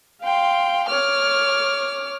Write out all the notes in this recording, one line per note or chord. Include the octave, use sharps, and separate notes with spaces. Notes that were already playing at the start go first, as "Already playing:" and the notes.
F5 G5 C6
C#5 D6 F6